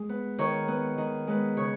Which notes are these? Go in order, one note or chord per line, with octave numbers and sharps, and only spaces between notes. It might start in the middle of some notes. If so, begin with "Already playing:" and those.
Already playing: G#3
B3
D#3 C#5
B3
D#3
G#3 B3
C#3 C#5